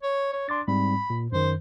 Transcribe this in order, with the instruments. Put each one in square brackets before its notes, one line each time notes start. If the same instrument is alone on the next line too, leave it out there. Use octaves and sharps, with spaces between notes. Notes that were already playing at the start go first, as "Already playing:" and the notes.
[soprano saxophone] C#5
C#5
[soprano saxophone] D4 [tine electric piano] C6 D6 A6
[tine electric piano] G#2 G3 C4 [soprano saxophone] B5
[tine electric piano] A#2
[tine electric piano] F#2 D#3 [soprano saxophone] C5